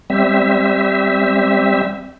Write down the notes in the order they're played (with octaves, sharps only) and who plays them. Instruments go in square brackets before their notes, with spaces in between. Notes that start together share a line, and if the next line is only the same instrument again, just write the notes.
[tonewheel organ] G3 C4 E5